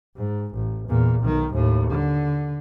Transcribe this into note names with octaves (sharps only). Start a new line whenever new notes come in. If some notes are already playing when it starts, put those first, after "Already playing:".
G#2
A1
E2 A#2
B1 D#3
D#2 A2
D3